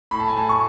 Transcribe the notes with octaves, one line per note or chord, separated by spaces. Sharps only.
A2 B5
A5
G#5
A2 A5
C#6